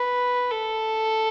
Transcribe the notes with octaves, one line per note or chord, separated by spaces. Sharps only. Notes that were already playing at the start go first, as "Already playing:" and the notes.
Already playing: B4
A4